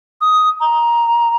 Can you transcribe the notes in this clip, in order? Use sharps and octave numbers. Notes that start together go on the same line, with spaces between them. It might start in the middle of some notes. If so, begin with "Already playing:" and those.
D#6
A#5